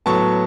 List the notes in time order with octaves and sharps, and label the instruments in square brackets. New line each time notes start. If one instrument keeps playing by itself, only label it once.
[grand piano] A2 F#3 B3 A5 C#6